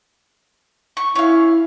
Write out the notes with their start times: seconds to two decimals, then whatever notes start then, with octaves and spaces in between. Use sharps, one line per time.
0.97 C#6
1.16 C#4 E4 F5